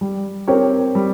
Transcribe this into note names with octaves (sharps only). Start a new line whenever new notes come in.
G3
C4 G4 A#4 C#5
G3